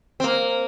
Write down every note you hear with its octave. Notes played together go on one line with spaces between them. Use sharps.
C4
A#3